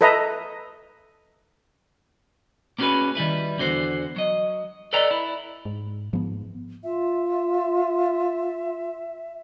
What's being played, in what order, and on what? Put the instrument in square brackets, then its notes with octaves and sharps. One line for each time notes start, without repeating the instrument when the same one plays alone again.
[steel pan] A4 B4 D#5 E5 A#5
[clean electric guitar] A#3 B3 C#4 F#4 G#4 B4
D#3 G3 E4 B4
E2 D3 F#4 C5
F#3 D#5
A4 B4 D5 D#5 G5 A#5
E4
[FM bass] G#2
[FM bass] G#2 [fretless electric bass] F3 B3
[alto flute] F4 [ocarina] E5